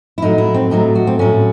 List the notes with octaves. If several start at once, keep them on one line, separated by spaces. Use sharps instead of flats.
E4
A2 F#3 A3 D#4
E4
C4
A2 F#3 A3 D#4
F#4
C4
A2 F#3 A3 C#4